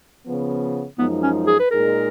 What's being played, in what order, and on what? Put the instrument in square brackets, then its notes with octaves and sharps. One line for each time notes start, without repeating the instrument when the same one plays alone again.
[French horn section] C#3 F3 B3
[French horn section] F#2 F3 G#3 D#4 [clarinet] B3
[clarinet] C#4
G#4
B4
[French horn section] A#2 G#3 D#4 G#4 [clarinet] A#4